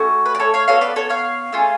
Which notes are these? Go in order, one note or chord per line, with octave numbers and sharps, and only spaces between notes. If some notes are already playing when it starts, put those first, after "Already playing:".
Already playing: A3 C#4 F#4
B4
D5
A4 C#5
C#5 F5
B3 F#4 A4 C#5 F5
B4 D5
A4 C#5
C#5 F5
A3 C#4 F4 G#4